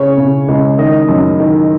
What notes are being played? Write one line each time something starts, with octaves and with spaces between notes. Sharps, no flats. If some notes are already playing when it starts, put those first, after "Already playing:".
Already playing: C#3 C#5
C#3
C#2
D#3 D#5
F#2
D#3